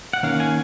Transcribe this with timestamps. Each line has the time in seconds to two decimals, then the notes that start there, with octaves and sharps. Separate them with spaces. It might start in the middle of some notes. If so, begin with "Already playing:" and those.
0.13 F#5
0.23 D#3 A#3 C#4 F5
0.40 G#5